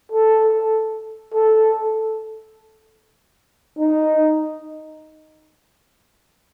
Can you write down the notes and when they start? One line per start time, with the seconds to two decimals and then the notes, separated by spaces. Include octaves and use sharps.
0.12 A4
1.34 A4
3.79 D#4